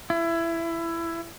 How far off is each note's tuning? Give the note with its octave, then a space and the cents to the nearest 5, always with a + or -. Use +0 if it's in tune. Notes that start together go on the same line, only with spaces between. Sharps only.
E4 +20